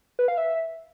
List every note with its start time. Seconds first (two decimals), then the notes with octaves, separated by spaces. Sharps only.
0.19 B4
0.28 F5
0.38 E5